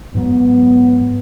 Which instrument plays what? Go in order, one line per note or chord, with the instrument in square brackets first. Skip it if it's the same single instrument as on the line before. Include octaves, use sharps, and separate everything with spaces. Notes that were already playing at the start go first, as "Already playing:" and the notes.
[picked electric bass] G#2 F#3 [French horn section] B3